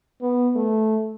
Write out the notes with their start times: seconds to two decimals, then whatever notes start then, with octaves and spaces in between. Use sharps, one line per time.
0.21 B3
0.55 A3